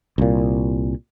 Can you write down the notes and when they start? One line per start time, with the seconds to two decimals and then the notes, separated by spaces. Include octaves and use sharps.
0.18 C2 A#2